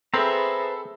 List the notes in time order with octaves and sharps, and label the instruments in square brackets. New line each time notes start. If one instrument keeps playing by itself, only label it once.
[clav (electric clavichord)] C4 [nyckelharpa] G#4 E5 [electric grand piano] A4 B5 [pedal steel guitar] B4 C5 A#5